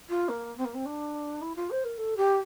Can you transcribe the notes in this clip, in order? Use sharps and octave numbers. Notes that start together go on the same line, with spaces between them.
F4
A#3
C4
A#3
C4
D4
E4
F4
C5
A#4
A4
G4